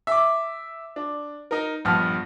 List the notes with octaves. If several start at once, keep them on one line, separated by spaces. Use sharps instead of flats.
E5 D6
D4
D#4 A#4
A#1 G2 B3 A5 F6